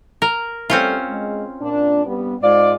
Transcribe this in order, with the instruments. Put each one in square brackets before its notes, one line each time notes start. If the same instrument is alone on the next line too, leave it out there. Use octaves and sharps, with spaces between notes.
[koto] A#4
[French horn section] G3 A3 [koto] C4 C#4 F4
[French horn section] G#3
A#2 D4
G2 G3 B3
[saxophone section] G#2 F4 D5 [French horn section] G#3